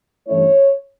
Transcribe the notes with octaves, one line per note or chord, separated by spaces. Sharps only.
G2 E3 A3 C#4 E4 C#5